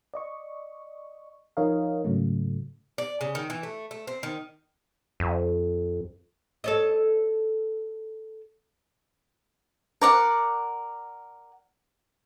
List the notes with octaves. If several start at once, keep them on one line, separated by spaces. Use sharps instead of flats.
D5 D#5 C#6
F3 D#4 A#4 C#5 D#5 F5
G#2 C#3 F#3 A3
D5
C#3
D#3
E3
A3
A3
C4
D#3
F2
A4 C#5 D#5
A#4 D5 F#5